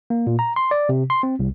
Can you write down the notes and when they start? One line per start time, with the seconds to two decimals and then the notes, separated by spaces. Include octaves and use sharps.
0.10 A#3
0.27 A#2
0.39 A#5
0.56 C6
0.71 D5
0.89 C3
1.10 C6
1.23 C4
1.39 C2